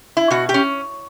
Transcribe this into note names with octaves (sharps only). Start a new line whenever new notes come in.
E4
B2 F#4
G4
C#4